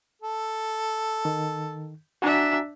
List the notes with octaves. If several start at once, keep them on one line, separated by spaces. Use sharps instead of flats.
A4
D#3
D4 F#4 E5 G#5 A#5